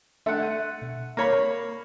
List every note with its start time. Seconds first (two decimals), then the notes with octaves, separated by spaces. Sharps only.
0.26 A3 D4 E5 F#5 C6
0.40 G#6 D#7
0.82 B2
1.17 A#3 C#5 B5